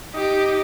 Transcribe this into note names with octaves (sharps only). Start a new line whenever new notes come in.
D#4 G4